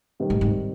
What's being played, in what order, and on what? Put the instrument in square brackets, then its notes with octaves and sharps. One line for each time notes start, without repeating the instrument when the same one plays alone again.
[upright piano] C3 D#3 G3 C4
[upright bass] A2
G#2